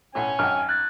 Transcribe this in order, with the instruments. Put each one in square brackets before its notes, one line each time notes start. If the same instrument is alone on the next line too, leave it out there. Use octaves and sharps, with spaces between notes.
[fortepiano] B1 A2 [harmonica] C#4 G#5
[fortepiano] G#1 F#2 G5 [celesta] F6
[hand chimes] F#6 G#6 A6